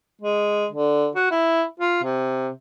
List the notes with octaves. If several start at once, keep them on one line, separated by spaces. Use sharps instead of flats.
G#3
D3
F#4
E4
F4
C3